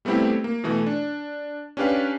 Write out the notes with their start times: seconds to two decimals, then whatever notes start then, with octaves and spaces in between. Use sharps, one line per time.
0.05 G3 A3 B3 C4 E4 G4
0.44 A#3
0.64 B2 E3 A3
0.86 D4
1.77 C#4 D4 G4 B4 F5